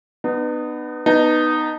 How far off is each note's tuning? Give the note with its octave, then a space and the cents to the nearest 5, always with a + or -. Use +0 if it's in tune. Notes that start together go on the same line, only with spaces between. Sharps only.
B3 +5 D#4 -45
B3 +0 D#4 -10 A5 +25